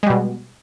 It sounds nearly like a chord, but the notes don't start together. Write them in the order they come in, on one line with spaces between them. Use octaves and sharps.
G#3 G3 B2